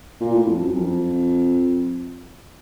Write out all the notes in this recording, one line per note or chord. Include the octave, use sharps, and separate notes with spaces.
A#2
A2
F2
F#2
F2